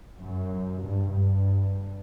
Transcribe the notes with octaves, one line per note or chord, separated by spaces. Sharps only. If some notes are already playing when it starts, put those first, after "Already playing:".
F#2
G2
G2